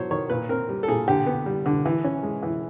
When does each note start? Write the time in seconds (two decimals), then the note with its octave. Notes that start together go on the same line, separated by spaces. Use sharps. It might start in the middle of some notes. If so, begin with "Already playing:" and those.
Already playing: F#3 B3 C5 C#5
0.11 D#3 C#5
0.30 A#2 B4
0.49 C4 A#4
0.69 G3
0.83 A4
0.88 A#2 G#4
1.08 D3 G4
1.26 B3
1.46 G3
1.66 D3
1.86 E3
2.04 C#4
2.23 G#3
2.43 E3